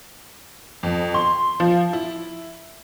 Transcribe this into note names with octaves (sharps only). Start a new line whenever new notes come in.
F2
C6
F3
E4